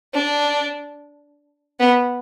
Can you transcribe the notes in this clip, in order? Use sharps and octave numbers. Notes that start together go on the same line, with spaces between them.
D4
B3